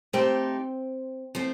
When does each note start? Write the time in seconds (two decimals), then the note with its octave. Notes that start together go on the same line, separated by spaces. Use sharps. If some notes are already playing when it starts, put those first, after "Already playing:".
0.13 A3 C4 D#4 G4
1.35 F3 A3 C4